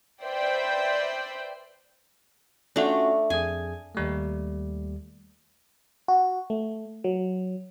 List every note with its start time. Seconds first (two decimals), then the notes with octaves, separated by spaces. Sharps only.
0.23 B4 C5 D5 E5 G5
2.76 A3 C#4 D4 F4 F#4
3.30 F2 G#4 G#5
3.95 D#2 G3 A3
6.08 F#4
6.50 A3
7.04 F#3